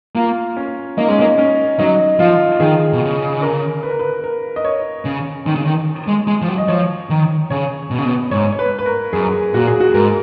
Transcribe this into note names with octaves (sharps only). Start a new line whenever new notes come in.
A#3 F4
C#4
A#3 D#4
G#3 C#4
A#3 D#4
C#4
F#3 D#4
F3 F4
D#3 G#4
B2
C#3
A#4
B4
A#4
B4
A#4
D#5
C#5
C#3
D#3
C#3
D#3
G#3
G#3
F3
F#3
D#5
F3 C#5
D#3
C#3 C#5
B2
C#3
B2
G#2 C#5
C#5
B4
B4
A#4
F#2 G#4
A#2 F#4
G#4
F#4
G#2 A#4